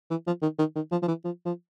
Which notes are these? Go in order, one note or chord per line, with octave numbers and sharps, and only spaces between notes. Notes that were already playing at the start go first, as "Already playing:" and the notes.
E3
F3
D#3
D#3
D#3
F3
F3
E3
F3
F3